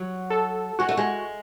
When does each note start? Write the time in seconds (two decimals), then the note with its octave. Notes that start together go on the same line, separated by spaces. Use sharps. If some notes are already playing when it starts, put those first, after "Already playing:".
Already playing: F#3
0.30 A4
0.79 G#3 F#4
0.89 A3
0.97 G#3